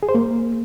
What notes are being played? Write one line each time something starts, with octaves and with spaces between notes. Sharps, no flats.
G#4
C5
A#3